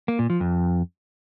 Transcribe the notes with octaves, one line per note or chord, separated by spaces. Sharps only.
A#3
A#2
F3
F2